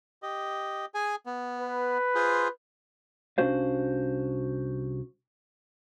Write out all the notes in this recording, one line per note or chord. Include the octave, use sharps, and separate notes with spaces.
G4 D#5
G#4 G#5
B3
B4
F4 G#4 C5
C2 C#4 D4 F#4 C5 F5